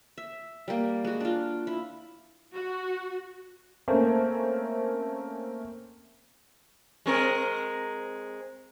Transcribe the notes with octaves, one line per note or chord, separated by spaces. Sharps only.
E5
G3 A#3
G#3 F#4
D4 F4
E4
F#4
A3 A#3 C4 C#4
G#3 C4 A#4